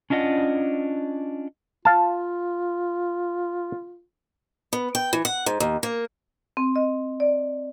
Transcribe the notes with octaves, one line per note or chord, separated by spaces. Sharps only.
C#4 D4 F4 D#5 E5 F#5
F4 F5 A5
B3
G5
E3
F#5
G#2
D#2
A#3
C4
D#5
D5